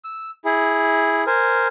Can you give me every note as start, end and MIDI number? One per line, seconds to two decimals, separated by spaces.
0.05 0.30 88
0.45 1.24 64
0.45 1.24 68
1.27 1.67 70
1.27 1.67 72
1.27 1.67 80